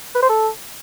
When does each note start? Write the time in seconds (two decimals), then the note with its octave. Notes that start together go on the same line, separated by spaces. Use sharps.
0.15 B4
0.22 C5
0.30 A4